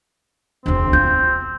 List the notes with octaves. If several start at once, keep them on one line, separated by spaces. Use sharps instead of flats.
E1 D2 C4
F4 G6